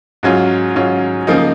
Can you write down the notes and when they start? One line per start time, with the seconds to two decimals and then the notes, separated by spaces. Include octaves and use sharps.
0.23 G#2 F#3 C#4 F4
0.75 G#2 F#3 C#4 F4
1.27 C#3 F3 A#3 D#4